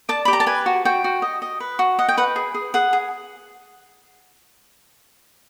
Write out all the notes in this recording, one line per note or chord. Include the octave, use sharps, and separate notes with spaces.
D5 A5
B5
G4
A#5
A5
B4 G#5
F#4
F#4 G5
F#4
D#5
D#5
B4
F#4
D#5 F#5
G5
B4 F#5
G#4
G#4
G#4 F#5
G#4